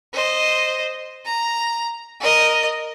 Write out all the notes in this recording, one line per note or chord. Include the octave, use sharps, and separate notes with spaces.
C5 D#5
A#5
A#4 D#5